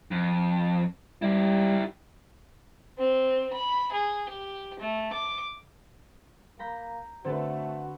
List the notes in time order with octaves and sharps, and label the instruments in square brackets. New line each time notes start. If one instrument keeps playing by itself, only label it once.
[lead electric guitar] F2
[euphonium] G3 [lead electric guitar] E4 G4
[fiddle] C4
B5
G#4
G4
A3
D6
[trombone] A#3 [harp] A#5 B5 G6
[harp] D3 [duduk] A3 [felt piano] C4 A4 B4 [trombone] F#4